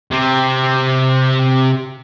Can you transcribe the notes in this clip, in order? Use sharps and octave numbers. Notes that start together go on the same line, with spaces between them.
C3 C4